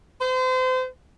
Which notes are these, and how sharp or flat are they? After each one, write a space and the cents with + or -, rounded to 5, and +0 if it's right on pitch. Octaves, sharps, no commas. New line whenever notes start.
C5 -35